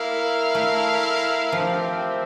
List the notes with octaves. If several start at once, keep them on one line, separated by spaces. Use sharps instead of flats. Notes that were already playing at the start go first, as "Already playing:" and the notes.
Already playing: A#3 E4 A#4 F5
A3
F3 C4 G4 A#4 E5 G5